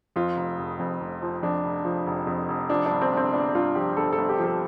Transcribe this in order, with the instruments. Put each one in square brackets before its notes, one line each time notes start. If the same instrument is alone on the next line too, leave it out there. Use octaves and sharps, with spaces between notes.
[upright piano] F2 F4
F1
F1
F2
F1
F3
F2 D4
F1
F3
F1
F2
F1
F3 D4
D4
G1
C4
G1
C4
G1 D4
G1 F4
F3 G4
G1 A4
A4
G1
G4
F3
A4